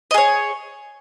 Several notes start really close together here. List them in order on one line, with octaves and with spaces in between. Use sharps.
D#5 G#4 C#5